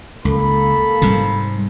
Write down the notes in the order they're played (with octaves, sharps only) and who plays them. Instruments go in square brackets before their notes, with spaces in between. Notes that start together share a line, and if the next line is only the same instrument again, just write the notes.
[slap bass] C#2 [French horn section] A#3 A4 [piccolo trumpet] B5
[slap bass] G#2 C3 [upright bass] G3